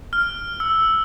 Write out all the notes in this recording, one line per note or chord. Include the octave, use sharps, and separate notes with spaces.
F6
E6